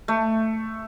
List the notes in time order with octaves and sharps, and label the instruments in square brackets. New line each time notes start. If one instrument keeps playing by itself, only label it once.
[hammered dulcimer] A3